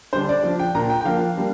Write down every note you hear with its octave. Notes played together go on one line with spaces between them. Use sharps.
D3 G3 D4 C5
D5
F3 D4
G5
A#2 A#3 D4 A#5
G5
G5
F3 A#3 D4 F5
G3 A#3 D4